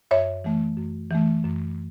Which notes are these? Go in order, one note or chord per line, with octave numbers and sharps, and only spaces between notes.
F#2 C#5 E5
E3 A3
F#2
E3 A3
F#2